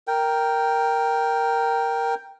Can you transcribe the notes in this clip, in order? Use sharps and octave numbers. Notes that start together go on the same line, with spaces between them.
A#4 G5